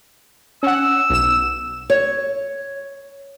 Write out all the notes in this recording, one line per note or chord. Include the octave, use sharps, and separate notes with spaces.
C#4 F#5 E6
B1 E7
C#5